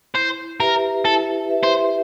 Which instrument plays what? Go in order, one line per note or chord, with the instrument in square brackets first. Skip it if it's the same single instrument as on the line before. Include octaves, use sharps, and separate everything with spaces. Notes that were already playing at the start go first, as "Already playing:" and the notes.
[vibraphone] E4 [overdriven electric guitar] C5
[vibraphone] G4 B4 E5 [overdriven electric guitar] A#4
[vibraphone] E4 [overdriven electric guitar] A4
[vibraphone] G4 B4 E5
[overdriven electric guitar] C5